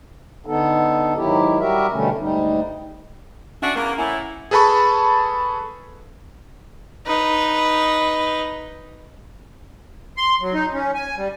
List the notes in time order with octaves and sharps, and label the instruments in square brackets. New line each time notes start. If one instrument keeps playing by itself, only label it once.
[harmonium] D3 B3 D#4 A4
G#2 D#3 F#3 E4 G4
G3 F#4 G4 A#4 E5
B2 D3 G3 A3 C#4
D2 G#2 G3 D#4
[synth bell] C#4 [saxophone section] D4 F#4 E5
[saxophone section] E2 A#3 [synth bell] F#5
[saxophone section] A2 E4 [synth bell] F#5 G#5 A#5
[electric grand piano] G#4 A4 B4 A5 B5 C#6
[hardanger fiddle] D#4 B4
[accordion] C6
F#3
D#4
C#4
G#5
G3